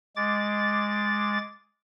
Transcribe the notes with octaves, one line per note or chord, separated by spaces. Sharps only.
G#3 D6 A6